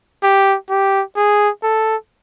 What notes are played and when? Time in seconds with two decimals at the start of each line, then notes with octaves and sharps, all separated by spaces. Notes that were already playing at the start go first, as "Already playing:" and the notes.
0.24 G4
0.70 G4
1.17 G#4
1.63 A4